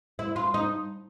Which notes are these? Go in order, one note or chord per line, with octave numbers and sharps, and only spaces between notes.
E4
F4
D#4